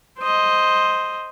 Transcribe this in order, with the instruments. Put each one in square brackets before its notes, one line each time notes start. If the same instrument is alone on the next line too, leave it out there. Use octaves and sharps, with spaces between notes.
[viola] C5 D#5